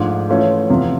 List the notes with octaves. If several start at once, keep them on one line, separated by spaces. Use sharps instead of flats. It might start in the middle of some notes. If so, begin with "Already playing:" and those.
Already playing: G#2 F3 A3 D4
E3 A3 C#4 F4
E2 C3 F3